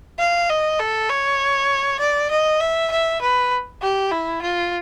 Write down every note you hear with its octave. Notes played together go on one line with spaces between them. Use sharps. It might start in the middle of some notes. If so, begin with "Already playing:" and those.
F5
D#5
A4
C#5
D5
D#5
E5
E5
B4
G4
E4
F4